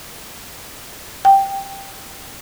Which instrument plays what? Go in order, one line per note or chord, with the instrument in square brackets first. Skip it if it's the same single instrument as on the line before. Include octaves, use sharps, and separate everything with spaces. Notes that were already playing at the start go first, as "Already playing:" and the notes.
[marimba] G5